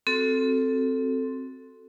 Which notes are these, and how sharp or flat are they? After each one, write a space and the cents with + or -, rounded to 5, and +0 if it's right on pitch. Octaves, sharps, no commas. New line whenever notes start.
C4 +0 F#4 +0 A4 +0